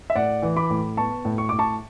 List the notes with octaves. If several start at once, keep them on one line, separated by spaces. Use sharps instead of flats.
E5
A2 D5 F#5
E3
B5 D6
A2
B3 A5 C#6
A2
C#6
A2 D6
A5 C#6